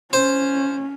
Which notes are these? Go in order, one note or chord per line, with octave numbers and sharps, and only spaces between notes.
C#4 C5